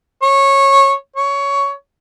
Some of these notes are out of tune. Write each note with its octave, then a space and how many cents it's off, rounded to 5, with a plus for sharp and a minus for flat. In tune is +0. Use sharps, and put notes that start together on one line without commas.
C#5 -15
C#5 +15